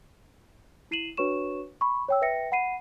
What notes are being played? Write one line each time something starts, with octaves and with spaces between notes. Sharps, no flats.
E4 C7 D#7 E7 F#7
D4 F#4 B4 C#5 C#6 E7
B5 C#6
C#5 G5 E6
B4 E5 G5 A#6 C#7
F#5 B5 C7 D#7